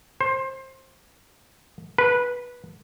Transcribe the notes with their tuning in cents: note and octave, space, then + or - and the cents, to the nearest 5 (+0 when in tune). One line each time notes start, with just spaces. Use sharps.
C5 +20
B4 -15